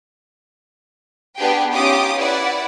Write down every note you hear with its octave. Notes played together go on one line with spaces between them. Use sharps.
B3 D4 G4 G#4 G5
C#4 D#4 F4 G4 D6 D#6
E4 B4 D5 F#5